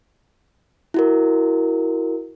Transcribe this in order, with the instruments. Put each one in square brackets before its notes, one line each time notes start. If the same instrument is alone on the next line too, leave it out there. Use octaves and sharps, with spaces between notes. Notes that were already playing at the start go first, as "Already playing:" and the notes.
[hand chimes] E4 F#4 A#4